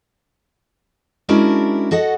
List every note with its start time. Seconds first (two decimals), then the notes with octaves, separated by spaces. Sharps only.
1.29 G#3 C#4 D4 E4 F#4 A#4
1.91 F#4 A4 D#5 F#5